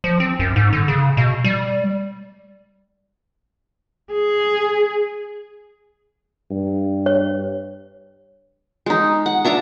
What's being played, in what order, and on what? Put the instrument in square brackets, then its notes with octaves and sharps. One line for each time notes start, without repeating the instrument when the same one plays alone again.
[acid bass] F3
C4
F#2
G#2
D3
C#3
B2
G3
[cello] G#4
[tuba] G2
[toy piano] C#5
[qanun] G#3 D#4
F#5
D4 E5 A5 A#5